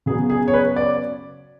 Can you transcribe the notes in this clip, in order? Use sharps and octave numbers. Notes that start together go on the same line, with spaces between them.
C#3 F#3 B3 G#4
G#4
C#5
B4
D5